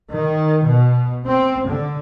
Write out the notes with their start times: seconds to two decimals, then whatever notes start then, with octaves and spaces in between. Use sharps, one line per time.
0.12 D#3
0.65 B2
1.26 C4
1.67 D3